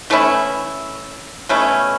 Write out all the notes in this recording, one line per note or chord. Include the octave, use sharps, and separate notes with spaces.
E3 A3 C#4 E4
B2 A3 C#4 E4